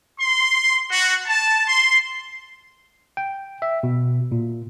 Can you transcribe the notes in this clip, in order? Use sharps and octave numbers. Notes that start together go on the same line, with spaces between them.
C6
F#4
A5
C6
G5
E5
B2
A#2